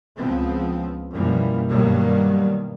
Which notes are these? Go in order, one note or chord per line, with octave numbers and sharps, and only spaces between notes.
C#2 C#3 F3 B3 C4
F#2 B2 E3 F3 G3 A#3
G2 B2 D#3 F#3 G3 A#3